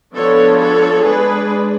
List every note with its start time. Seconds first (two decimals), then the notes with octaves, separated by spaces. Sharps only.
0.15 F3 B3 D4 A4 C#5
0.59 A4 C#5
1.03 G#3 D4 G#4 B4